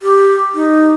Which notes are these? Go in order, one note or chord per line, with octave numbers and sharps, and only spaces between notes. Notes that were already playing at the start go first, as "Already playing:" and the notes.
G4
D#4